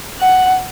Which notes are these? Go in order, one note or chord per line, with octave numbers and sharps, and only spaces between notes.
F#5